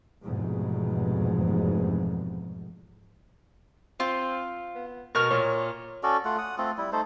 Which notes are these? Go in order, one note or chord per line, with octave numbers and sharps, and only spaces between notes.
F1 E2 G#2 B2
C4 F4
B3
B2 A#4 C#6 F6
A#2 C#5
C#4 F#4 A4 D5
A3 F4 F#5
F#5 D#6
A3 C4 F4 A4
G3 E4
A3 D#4 A4 C5